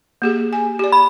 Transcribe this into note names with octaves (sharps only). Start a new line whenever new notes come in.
A#3 G4 G#4
G#5
G4 D5
B5